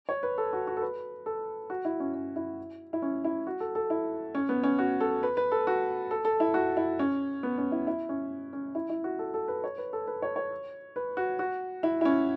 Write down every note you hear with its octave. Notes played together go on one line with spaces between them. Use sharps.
C#5
B4
A4
F#4
F#4
A4
B4
A4
F#4
E4
C#4
C#4
E4
E4
C#4
E4
F#4
A4
A4
E4
C#4
B3
C#4
F#4
A4
B4
B4
A4
F#4
A4
A4
E4
F#4
E4
C#4
B3
C#4
E4
E4
C#4
C#4
E4
E4
F#4
A4
A4
B4
C#5
B4
A4
B4
C#5
C#5
B4
F#4
F#4
E4
E4
C#4